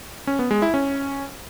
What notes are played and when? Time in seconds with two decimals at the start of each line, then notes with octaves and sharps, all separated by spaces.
0.27 C#4
0.39 B3
0.51 G#3
0.62 E4
0.74 C#4